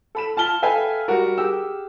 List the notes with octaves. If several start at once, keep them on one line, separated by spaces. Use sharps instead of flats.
A4 B5 E7
F4 A5 F6 G7
A4 B4 E5 F5 G5 G#5
G3 F#4 A#4
G4 G#4 E6